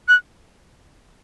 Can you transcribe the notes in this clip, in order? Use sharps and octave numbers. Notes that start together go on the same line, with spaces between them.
F#6